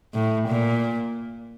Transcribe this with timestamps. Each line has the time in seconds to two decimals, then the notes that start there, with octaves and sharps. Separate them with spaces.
0.15 A2
0.48 A#2